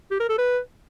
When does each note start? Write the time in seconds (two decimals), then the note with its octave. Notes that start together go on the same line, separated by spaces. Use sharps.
0.11 G4
0.20 A#4
0.29 A4
0.38 B4